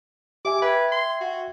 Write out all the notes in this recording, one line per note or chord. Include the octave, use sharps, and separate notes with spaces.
G4 E5 G#5 D6
B4 E5 G5 G#6
C6
F#4